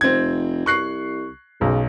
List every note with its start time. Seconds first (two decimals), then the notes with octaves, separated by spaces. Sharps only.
0.01 F1 C4 G#6
0.66 C2 C#6 F#6 C7
1.61 B1 C#3